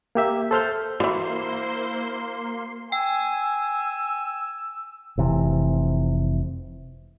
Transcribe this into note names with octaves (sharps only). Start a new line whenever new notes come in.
A#3 G4 E5
A4 C5 F6 G6
D3 E3 A#3 E4 F#4 C5 C6
G5 G#5 E6
F1 C3 E3